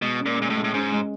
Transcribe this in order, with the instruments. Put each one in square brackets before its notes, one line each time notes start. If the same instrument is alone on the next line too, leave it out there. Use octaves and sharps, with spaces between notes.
[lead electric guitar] B2 [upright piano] G#3
[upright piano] C#4
[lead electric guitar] A#2
[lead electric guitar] A#2 [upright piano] G#3
[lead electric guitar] A2
[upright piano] G#3
[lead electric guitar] A2
[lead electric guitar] G#2 [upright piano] C#4
[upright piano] G#3